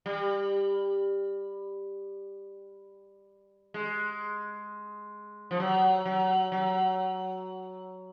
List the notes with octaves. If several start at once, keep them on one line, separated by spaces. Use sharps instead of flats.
G3
G#3
F3
F#3
F#3
F#3